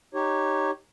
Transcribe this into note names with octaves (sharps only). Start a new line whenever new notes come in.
D#4 G4 C#5